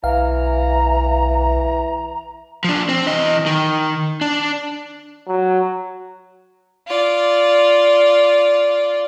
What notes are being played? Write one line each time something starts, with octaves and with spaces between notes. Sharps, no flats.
B1 E3 F5 A#5
F3 D4
C4
E3 D#5
D#3
D4
F#3
F4 D5